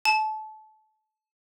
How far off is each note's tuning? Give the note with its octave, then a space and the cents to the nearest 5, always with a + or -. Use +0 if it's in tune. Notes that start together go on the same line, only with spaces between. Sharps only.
A5 -25